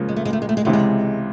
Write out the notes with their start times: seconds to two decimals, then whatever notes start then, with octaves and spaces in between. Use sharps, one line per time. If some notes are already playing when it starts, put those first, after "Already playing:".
Already playing: C#2 C#3 F3 A#3
0.09 G#3
0.16 A3
0.25 G#3
0.33 A3
0.42 G#3
0.49 A3
0.57 G#3
0.65 C#2 C3 E3 A3
0.73 G#3